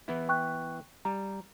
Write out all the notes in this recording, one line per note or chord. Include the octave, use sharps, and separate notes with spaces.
E3 B3 E4
G5 C#6 F#6
G3 A#5